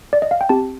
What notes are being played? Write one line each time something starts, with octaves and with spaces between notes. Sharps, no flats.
D5
D#5
F5
G5
C4 G4 A5